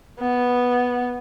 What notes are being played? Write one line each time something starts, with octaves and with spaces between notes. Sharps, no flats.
B3